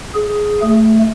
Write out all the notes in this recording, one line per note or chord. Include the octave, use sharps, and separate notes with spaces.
G#4
A3